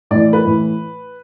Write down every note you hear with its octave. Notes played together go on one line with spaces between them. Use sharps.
A2 E3 D5
B4
A2 E3